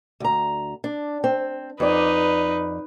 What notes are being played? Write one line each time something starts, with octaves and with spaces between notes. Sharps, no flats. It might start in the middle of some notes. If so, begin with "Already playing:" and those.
D2 A#5
D4
C4
F2 D#4 B4 D5